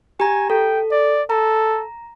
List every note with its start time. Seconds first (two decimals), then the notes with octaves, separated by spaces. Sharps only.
0.20 G4 G#5 A#5
0.50 A4 G5
0.91 D5
1.30 A4 A#5